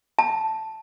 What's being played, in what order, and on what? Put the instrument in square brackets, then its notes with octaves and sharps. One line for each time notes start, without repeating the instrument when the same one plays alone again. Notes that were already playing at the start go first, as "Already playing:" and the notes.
[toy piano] A5